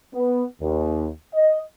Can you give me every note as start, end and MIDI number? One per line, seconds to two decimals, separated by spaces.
0.14 0.44 59
0.61 1.08 39
1.33 1.61 75